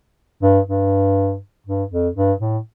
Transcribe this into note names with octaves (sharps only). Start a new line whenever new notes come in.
G2
G2
G2
F2
G2
A2